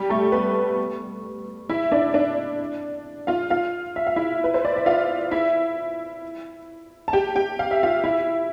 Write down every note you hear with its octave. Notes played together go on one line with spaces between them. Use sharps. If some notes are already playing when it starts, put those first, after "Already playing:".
Already playing: G3 G4
A3 A4
B3 B4
E4 E5
D4 D5
D4 D5
F4 F5
F4 F5
E5
F5
E4 E5
B4
C5
D5
E5
F4 F5
E4 E5
A5
G4 G5
G4 G5
F5
E5
F4 F5
E4 E5